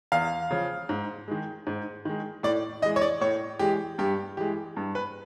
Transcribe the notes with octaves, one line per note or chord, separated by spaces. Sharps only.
E2 F5
C#3 F3
G#2
D#3 G#3
G#2
D#3 G#3
A2 D5
E3 G#3 D#5
C#5
D5
A2 C#5
E3 G#3 G4
G2 G4
E3 G#3 G4
G2
B4